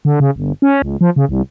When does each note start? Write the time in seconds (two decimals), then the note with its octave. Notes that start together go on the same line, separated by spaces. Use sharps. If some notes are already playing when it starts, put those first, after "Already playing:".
0.05 D3
0.20 C#3
0.36 G1
0.62 C#4
0.82 C#2
1.01 F3
1.16 C#3
1.29 C2